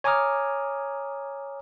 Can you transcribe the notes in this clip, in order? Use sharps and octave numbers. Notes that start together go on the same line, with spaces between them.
C#5 G#5 A#5 D6 D#6 F6